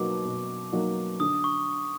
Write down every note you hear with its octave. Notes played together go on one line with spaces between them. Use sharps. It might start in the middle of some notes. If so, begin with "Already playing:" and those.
Already playing: B2 F#3 A#3 D#4 F#4 D6
B2
F#3 A#3 D#4 F#4
D3 D#6
C#6